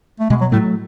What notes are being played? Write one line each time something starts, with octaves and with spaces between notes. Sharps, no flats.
A3
B2 G#3
F#3
A2 F#3 A3